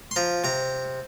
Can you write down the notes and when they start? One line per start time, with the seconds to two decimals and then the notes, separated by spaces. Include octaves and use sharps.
0.11 C6
0.16 F3 A#5
0.44 C3 A#5